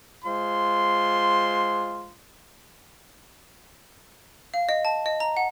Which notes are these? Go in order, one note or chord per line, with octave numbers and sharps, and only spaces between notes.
G#3 F4 C5 C6
F5
D#5
A5
D#5
A#5
F#5